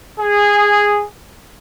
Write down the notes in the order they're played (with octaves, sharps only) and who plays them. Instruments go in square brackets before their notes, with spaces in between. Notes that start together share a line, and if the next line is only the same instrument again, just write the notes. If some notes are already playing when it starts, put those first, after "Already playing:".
[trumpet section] G#4